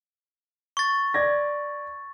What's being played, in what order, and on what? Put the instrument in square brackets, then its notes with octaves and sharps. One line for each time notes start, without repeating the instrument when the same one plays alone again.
[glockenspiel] C#6 A6
[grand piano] D5 G#6 A#6